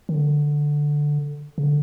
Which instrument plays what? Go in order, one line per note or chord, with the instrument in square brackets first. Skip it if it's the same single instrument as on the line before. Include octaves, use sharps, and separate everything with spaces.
[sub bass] D#3
D3
C#3
D3